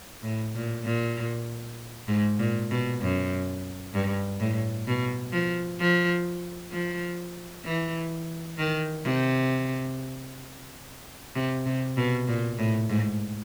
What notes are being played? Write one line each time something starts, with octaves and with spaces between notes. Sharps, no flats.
A2
A#2
A#2
G#2
A#2
B2
F#2
G2
A2
B2
F3
F3
F3
E3
D#3
C3
C3
C3
B2
A#2
A2
G#2